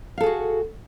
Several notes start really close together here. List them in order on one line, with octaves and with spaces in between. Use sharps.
F5 A4 G#4 F#4